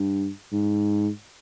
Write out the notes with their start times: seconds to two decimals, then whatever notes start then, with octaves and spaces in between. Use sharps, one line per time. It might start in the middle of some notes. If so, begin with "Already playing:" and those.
Already playing: G2
0.52 G#2